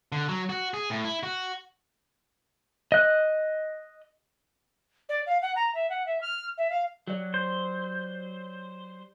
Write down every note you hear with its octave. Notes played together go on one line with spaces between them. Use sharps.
D3
F#3
F#4
G#4
A2
E4
F#4
D#5 F#6
D5
F5
F#5
A#5
E5
F#5
E5
F6
E5
F5
F#3 G4 D5
C5